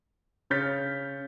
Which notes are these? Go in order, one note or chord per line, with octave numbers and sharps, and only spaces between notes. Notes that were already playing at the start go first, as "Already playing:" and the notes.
C#3 C#5 F6 G6 A6 B6